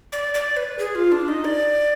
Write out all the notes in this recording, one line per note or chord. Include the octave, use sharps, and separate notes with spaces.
D5
D5
B4
G#4
F4
D4
D#4
D5